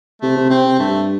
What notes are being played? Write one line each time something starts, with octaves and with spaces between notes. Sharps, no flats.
C3 A3
C3
C3 C4
C3
G2 A3